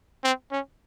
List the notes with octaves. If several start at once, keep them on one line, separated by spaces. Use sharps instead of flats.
C4
C#4